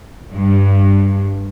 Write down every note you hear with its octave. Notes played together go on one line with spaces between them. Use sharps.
G2